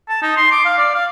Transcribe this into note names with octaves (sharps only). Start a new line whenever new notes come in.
A5
D#4
C6
D6
F5
D5
F5